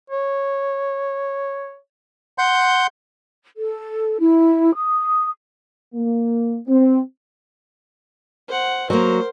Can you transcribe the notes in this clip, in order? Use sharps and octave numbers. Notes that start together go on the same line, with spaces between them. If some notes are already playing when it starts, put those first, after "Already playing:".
C#5
F#5 C6 G6
A4
E4
D#6
A#3
C4
C5 F#5
F#3 A#3 A#4 C5